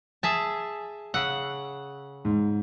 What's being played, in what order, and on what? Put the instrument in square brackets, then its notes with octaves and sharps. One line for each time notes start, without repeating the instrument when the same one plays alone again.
[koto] G#4 E5 A5 [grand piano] G#5
[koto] C#3 F#5 [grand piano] E6
[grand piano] G#2